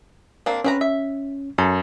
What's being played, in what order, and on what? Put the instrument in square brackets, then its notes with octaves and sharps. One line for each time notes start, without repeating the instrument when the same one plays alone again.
[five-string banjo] A#3 C4 D4
[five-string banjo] C4 B4 A#5 [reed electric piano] C#4
[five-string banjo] E5
[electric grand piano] F#2 [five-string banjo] A4